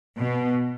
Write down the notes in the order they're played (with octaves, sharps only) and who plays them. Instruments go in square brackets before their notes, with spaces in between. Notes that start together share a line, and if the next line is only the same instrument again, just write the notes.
[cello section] B2